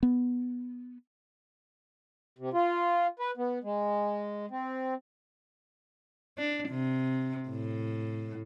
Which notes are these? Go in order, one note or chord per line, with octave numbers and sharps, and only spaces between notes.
B3
C3
F4
B4
B3
G#3
C4
D4
C3
A2